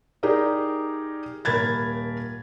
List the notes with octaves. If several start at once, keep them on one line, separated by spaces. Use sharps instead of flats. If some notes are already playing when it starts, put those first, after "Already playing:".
D#4 G4 G#4 A#4 D5
D#1 A#4 B5 G#6 A6